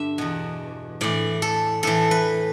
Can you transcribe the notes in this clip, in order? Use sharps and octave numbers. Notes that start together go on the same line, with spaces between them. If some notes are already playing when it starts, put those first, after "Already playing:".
Already playing: G2 D3 E5
E2 B2
A2 E3 D5
A4
A2 E3 A4
B4